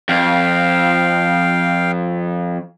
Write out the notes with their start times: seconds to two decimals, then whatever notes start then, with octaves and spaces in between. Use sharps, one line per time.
0.09 F2 F5 G5